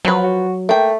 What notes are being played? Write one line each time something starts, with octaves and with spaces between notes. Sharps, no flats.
F3 F#3 B4
F#4
A3 A#3 G5